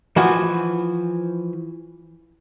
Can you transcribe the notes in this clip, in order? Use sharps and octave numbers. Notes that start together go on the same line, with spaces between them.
E3 F3 F#4